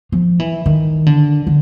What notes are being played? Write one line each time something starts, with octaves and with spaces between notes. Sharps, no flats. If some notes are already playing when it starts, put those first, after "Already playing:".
F3
E3
D#3
D3
D3